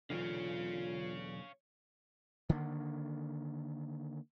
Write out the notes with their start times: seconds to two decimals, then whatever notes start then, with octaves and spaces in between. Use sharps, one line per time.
0.10 B1 E2 D3 F4 C#5 F5
2.49 D3 D#3 A#3